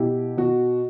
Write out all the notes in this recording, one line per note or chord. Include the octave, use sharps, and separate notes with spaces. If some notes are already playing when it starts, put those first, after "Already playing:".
Already playing: B2 E4 G4
B2 F#4